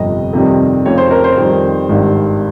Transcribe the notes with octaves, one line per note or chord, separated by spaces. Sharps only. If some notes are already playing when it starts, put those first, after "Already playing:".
Already playing: G1 F2 C3 D#5
F2 C3 D#3 G3
F1 F2 C#3 C#5
C5
A#4
C5
F2 D#3 G3
G#1 G2 D#3 G3